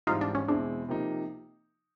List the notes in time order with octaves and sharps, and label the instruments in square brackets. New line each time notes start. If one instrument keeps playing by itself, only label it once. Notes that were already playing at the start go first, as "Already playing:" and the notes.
[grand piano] G#2 E3 G3 C4 [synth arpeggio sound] D#4 F4
[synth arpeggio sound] D4
C#4
[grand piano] E2 B2 G#3 C4 E4 [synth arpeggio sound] D4
[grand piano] C3 F3 A#3 D#4